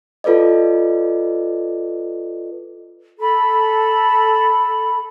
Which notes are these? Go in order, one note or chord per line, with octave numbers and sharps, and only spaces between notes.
F4 A4 B4 D5 D#5
A4 B5